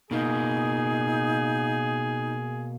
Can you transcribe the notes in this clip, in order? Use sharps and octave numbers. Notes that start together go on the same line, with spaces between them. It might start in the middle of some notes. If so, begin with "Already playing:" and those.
B2 A#3 D#4 G#4